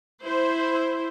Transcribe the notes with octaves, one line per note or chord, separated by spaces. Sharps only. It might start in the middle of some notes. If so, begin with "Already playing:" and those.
E4 C5